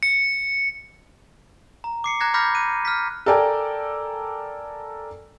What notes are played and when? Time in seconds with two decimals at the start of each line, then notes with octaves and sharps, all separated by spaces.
0.03 C#7
1.84 A#5
2.04 D6 C7 C#7
2.20 A#5 F#6 G#6 A#6
2.34 B5 D6 F6 G6 A#6 B6
2.55 F#6 D#7
2.85 F6 G6 B6
3.26 A4 A#4 D5 G5 G#5